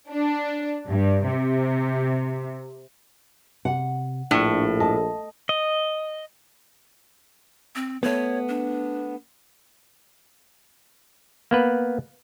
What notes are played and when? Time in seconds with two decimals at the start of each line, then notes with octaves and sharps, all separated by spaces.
0.10 D4
0.88 G2
1.26 C3
3.65 C3 F#5
4.31 A#1 A2 D4 C#6
4.80 D#5 A5
5.49 D#5
7.76 C4
8.03 A3 B3 C#5
8.48 D4
11.51 A#3 B3 B4